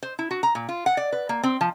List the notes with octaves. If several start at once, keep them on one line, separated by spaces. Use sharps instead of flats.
C5
E4
F#4
A#5
A#2
F4
F#5
D5
B4
A#3
C4
F3